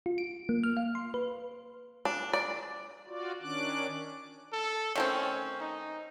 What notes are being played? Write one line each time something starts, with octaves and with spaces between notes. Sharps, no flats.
F4
D7
A#3
F6
F5
C6
B4
D4
D5
F4 F#4 D5
D#3 C#4 D4 D6 F#6
A4
D#3 A3 C4 C#4
D#4